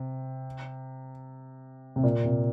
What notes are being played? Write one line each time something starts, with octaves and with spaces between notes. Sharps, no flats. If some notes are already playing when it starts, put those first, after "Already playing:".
Already playing: C3
C3
A#2
C3